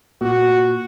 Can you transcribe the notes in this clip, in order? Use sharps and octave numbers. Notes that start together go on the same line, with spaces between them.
A#2 F#4